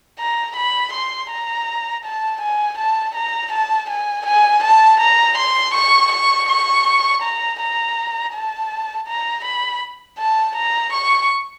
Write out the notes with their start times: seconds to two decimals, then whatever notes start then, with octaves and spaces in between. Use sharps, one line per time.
0.20 A#5
0.57 B5
0.94 C6
1.31 A#5
2.05 A5
2.42 G#5
2.79 A5
3.16 A#5
3.53 A5
3.90 G#5
4.27 G#5
4.64 A5
5.01 A#5
5.38 C6
5.75 C#6
6.12 C#6
6.49 C#6
7.23 A#5
7.60 A#5
8.34 A5
9.08 A#5
9.45 B5
10.19 A5
10.56 A#5
10.93 C#6